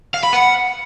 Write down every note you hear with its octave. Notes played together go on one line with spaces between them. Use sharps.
F5
B5
F#5